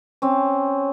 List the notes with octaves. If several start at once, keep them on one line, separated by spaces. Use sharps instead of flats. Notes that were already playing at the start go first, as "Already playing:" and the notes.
C4 C#4